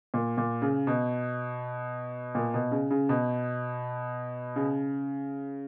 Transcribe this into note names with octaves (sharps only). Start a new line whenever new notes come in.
A#2
A#2
C#3
B2
A#2
B2
C#3
C#3
B2
C#3